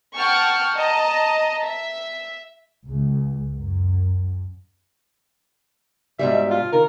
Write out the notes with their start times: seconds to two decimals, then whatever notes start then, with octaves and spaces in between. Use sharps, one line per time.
0.17 F#5 G5 A5 C#6 F6
0.77 D#5 A5 A#5
1.64 E5
2.86 C#2
3.54 F#2
6.19 G#2 B2 G3 E5
6.51 F4
6.73 D#3 A#4